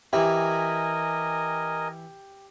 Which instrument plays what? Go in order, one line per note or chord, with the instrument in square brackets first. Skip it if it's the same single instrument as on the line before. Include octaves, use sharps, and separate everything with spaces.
[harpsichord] E3 E4 [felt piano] G4 [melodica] A#4 D#5 G#5